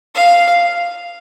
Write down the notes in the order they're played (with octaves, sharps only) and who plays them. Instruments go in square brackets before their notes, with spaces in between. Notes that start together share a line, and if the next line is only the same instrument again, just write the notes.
[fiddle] F5